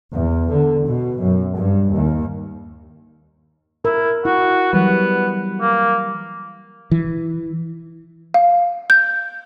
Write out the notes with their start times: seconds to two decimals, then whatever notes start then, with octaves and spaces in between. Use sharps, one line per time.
0.13 E2
0.51 D3
0.87 B2
1.20 F#2
1.57 G2
1.94 D#2
3.85 E4 A#4
4.25 E4 F#4
4.73 E3 F#3 G3 B3
5.61 A#3
6.91 E3
8.34 F5
8.90 G6